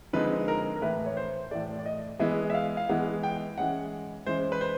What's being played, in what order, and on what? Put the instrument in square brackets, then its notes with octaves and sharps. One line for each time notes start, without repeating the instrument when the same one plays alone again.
[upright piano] D3 F3 G#3 C4 D#4 [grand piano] B4
[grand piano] A#4
A#4
[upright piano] A2 E3 A3 [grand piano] B4
[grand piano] C#5
C5
[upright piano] A2 E3 A3 [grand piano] D5
[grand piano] D5
D#5
[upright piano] E3 G#3 B3 E4 [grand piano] E5
[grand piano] E5
F5
F5
[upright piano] E3 G#3 B3 E4 [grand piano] F#5
[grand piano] G5
[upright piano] E3 G#3 C#4 [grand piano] F#5
[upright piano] E3 G#3 C#4 [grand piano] C5
[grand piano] B4
C5